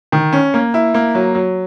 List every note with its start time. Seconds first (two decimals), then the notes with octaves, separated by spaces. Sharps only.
0.12 D#3
0.32 C#4
0.54 A#3
0.74 E4
0.94 A#3
1.15 F#3
1.35 F#3